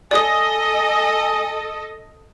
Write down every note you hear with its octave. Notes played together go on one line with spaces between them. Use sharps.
A4 D5 D#5 G#5 D#6